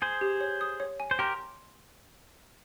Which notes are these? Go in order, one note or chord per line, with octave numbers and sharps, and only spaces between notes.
G#4 C5 G#5
G4
C#5
D#6
C#5
G#5
C5
G4 A#4 C6